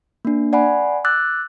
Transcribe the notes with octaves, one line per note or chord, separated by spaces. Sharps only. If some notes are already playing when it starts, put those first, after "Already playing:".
A#3 D4
D5 F#5 G#5 B5
D6 E6 F#6 A6